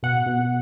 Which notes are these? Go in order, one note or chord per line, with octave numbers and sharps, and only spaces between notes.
B2 F#5
B2